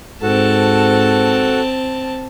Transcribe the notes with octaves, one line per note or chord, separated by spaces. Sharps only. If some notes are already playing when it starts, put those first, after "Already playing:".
G#2 C4 F#4 A4 A5